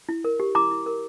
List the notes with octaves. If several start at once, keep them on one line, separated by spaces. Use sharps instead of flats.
E4
A#4
G4
E4 A#5 D6
E4
A#4